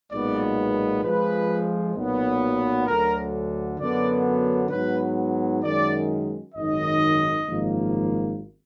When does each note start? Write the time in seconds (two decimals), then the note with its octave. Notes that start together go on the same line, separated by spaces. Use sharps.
0.11 B1 A#2 G#3 B3 D5
1.03 F2 F3 G#3 B4
1.95 B1 A#2 F#3 B3
2.87 D2 D3 F#3 A#4
3.79 F#2 D3 F#3 B3 D5
4.71 G#2 F#3 B3 B4
5.63 F#2 D#3 G#3 D5
6.54 G#1 F#2 D#3 D#5
7.47 G#1 F#2 F3 A#3